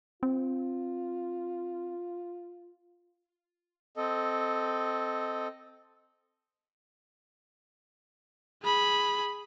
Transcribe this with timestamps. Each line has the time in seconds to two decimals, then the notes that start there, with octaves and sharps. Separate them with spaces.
0.23 C4 F4
3.96 C4 A4 D#5
8.63 G#4 B5